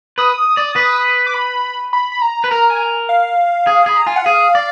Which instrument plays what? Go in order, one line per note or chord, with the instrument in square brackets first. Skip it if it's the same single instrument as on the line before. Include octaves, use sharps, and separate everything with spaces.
[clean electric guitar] B4 [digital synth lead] D#6
[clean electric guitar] D5
B4
[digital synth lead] D6
B5
B5
B5
A#5
[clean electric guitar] B4
[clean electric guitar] A#4 [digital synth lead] A#5
[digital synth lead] G#5
F5
[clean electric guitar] G#4
[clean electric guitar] G#4 [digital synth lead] B5
[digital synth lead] A#5
[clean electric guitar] F4 [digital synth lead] G#5
[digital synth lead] F#5
[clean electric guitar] G#4 [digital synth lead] F5
[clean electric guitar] D5